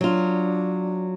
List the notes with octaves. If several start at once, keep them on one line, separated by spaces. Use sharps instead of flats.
F#3 D4 F4